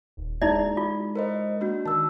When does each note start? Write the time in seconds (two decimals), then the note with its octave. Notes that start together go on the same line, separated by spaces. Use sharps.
0.17 D#1
0.42 G#3 D#4 E4 D5
0.77 F4
1.16 A#4 C5 D#5
1.61 A#3 D4 F#4
1.86 D#3 A5 E6